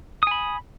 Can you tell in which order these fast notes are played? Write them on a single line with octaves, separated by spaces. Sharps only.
D#6 G#5 B5